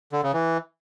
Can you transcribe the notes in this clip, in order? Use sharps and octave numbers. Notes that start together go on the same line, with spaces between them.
D3
C#3
E3